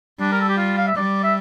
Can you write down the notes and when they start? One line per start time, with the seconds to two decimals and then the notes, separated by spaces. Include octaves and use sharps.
0.19 G3 D4
0.32 A#4
0.41 A4
0.49 G4
0.57 F4
0.77 F5
0.87 E5
0.96 G3 D5
1.24 E5